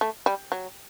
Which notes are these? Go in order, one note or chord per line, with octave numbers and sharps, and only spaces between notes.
A3
G3
F#3